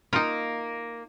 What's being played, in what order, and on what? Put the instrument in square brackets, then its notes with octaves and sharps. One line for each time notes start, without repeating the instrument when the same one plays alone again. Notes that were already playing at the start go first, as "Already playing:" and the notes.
[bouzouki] A#3 [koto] D#4 F4